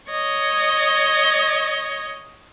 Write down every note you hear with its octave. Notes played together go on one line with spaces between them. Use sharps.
C#5 D#5